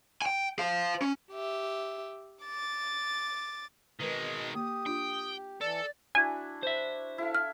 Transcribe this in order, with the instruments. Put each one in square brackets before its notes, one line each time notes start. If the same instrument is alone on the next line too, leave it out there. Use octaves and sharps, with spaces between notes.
[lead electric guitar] G5 G#5
C5 F5
C#4
[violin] G4 E5
D6 A6
[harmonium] B2 [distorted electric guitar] D#3 G#3 [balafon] A#4 B4
[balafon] A#3 [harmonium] G4 [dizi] D#6
[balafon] D4 F4 [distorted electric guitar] G5
[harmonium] E3 [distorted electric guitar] A4 [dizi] D5
[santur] D4 E4 F#4 [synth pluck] G#5
[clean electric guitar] C5 E5
[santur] E4 A4 F5
[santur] A5 [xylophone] F6